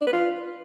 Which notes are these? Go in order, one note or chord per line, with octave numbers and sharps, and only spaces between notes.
D4
B4
F4